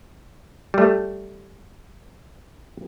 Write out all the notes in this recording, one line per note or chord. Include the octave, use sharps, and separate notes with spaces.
G3 A3